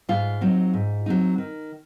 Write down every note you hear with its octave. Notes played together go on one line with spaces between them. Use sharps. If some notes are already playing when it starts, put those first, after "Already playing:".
G#2 F4
F#3 C4 D#4
G#2
F#3 C4 D#4
D#3